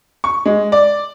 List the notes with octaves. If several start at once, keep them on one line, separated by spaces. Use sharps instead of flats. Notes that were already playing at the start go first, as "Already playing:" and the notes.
C#6
G#3
D5